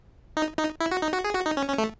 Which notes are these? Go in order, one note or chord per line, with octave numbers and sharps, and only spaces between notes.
D#4
D#4
E4
F#4
D#4
F#4
G#4
F#4
D#4
C#4
C#4
A3